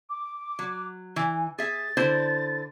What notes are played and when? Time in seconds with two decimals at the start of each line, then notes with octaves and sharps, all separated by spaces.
0.09 D6
0.59 F#3
1.16 E3 G#5
1.58 G#4 E5 A6
1.97 D3 E4 C5